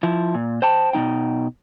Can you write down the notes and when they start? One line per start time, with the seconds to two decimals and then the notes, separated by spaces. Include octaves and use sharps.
0.03 F3 E4
0.34 A#2
0.62 C5 G5 A5
0.93 B2 G#3 D#4 G5